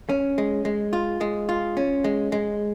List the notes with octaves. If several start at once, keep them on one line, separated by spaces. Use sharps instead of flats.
C#4
G#3
G#3
F4
G#3
F4
C#4
G#3
G#3